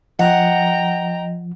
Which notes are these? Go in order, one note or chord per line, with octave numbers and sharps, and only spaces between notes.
F3 D#5 F#5 G5 A#5